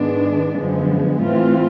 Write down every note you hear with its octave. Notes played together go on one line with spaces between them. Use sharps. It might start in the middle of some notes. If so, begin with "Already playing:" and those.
Already playing: G#2 D#3 G#3 B3 D4
F#2 D3 F3 G#3 B3
A2 E3 A3 C4 F4